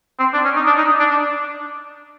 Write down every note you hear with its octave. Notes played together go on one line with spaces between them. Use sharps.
C4
D4
C#4
D#4
D4
D#4
D4
D4